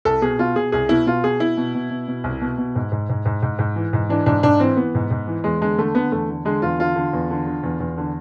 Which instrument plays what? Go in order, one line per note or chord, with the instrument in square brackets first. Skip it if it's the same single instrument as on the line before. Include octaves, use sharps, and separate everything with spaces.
[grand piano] C2 A4
B2 G#4
B2 F4
B2 G#4
C2 G#4
B2 E4
B2 F4
B2 G#4
B2 E4
B2
B2
B2
B2
C2
B2
B2
G#2
G#2
G#2
G#2
G#2
G#2
E3
G#2
E3 D4
G#2 D4
G#2 D4
E3 C4
E3 B3
G#2
G#2
E3
E2 G#3
D3 G#3
D3 A3
D3 B3
E2 A3
D3
D3 G#3
E2 F4
D3 F4
D3
E2
D3
D3
E2
E2
D3